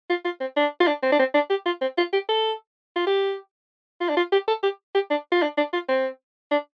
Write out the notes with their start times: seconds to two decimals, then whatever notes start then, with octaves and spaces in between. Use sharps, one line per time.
0.10 F4
0.25 F4
0.40 C4
0.56 D4
0.80 F4
0.87 D4
1.03 C4
1.12 D4
1.19 C4
1.34 D4
1.50 G4
1.66 F4
1.81 C4
1.97 F4
2.13 G4
2.29 A4
2.96 F4
3.07 G4
4.01 F4
4.09 D4
4.17 F4
4.32 G4
4.48 A4
4.63 G4
4.94 G4
5.10 D4
5.32 F4
5.42 D4
5.57 D4
5.73 F4
5.88 C4
6.51 D4